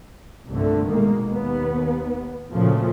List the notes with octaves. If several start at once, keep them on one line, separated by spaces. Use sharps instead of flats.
C2 G2 A#2 D3 A3
B2 D#3 G#3 A#3
D#2 B3
D2 A#2 C#3 F3 A3